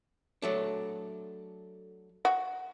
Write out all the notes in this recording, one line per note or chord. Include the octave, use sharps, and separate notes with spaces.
F#3 A3 D4
F#4